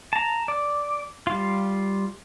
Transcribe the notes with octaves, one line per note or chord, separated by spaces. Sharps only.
A5 A#5
D5
G3 F4